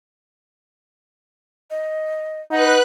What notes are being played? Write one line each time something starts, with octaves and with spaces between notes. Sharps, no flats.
D#5
D#4 B4 F#5 F#6